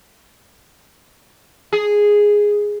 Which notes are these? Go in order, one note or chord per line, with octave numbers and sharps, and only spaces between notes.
G#4